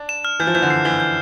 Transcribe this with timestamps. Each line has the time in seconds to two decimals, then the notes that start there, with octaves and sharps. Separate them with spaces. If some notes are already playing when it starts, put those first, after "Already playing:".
Already playing: D4
0.09 E7
0.25 F6
0.40 E3 G6
0.47 F3
0.54 E3 G6
0.62 D3
0.70 C7
0.85 E3 G7
1.00 G6